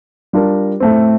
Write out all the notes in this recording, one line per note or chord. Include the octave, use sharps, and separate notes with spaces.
G3 D4 F4 A#4
A2 A3 C4